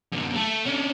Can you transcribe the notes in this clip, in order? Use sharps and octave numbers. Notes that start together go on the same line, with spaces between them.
F#2 D3
A3 A4
C#4 D4